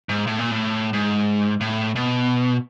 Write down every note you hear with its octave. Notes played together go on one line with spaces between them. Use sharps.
G#2
A2
A#2
A2
G#2
A2
B2